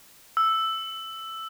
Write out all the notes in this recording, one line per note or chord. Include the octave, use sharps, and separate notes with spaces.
E6